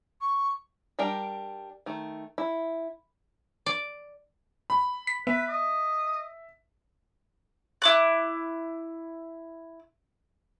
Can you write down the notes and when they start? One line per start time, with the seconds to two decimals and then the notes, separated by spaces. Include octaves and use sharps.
0.21 C#6
0.99 G3 D4 A#4 G5
1.86 D#3 A3
2.38 E4
3.66 D5
4.70 B5
5.07 B6
5.27 B3 B4 E5
5.49 D#5
7.82 E4 D6 F#6